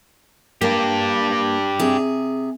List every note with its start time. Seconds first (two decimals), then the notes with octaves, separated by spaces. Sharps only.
0.61 A#3 D4 G4
1.79 C3 G#4